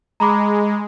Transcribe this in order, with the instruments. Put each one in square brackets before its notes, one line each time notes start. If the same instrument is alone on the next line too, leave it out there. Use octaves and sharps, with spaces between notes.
[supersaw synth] G#3 [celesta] A#5 B5 D6